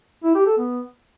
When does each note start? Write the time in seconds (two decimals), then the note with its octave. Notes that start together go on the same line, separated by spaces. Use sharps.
0.24 E4
0.35 G4
0.46 A4
0.58 B3